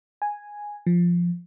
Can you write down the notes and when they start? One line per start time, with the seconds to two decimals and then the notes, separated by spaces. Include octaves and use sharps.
0.22 G#5
0.87 F3